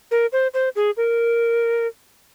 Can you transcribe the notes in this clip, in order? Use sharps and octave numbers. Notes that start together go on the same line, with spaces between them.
A#4
C5
C5
G#4
A#4